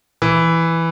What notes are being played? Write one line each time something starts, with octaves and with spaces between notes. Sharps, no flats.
E3